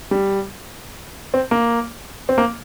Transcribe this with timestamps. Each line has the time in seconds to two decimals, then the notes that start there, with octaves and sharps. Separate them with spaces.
0.11 G3
1.34 C4
1.51 A#3
2.29 C4
2.38 A#3